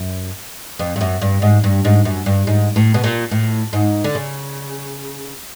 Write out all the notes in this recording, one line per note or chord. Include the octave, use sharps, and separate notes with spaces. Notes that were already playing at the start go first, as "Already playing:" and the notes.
Already playing: F#2
F2
G2
F#2
G2
G#2
G2
G#2
F#2
G2
G#2
A2
B2
A#2
A2
G#2
D3
C#3